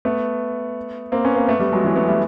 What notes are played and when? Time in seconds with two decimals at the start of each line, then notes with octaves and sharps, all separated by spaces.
0.05 A3 B3
1.12 A#3 C4
1.25 B3 C#4
1.36 A#3 C4
1.48 A3 B3
1.60 G3 A3
1.72 F#3 G#3
1.84 E3 F#3
1.96 A3 B3
2.08 G3 A3